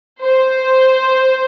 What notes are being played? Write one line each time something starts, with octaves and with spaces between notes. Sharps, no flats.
C5